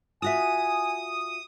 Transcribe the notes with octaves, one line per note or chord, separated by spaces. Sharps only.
F4 F#4 E5 G#5 D#6